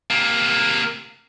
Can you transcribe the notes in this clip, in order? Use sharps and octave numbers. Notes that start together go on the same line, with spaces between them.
C3 A#3